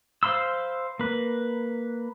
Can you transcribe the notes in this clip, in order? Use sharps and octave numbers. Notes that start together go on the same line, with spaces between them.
C5 F5 B5 C6 E6
A#3 B4